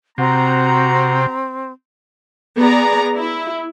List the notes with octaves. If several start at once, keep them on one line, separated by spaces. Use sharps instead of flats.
C3 C4 F#4 A#5
B3 G#4 D5 A#5
E4